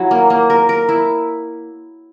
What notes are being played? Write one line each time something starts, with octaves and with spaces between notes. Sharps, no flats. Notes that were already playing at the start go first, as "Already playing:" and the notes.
Already playing: F#3 E4
A#3
A#3
A#4
A#4
E4